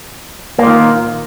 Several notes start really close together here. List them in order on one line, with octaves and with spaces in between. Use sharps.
A#3 A#2 D#3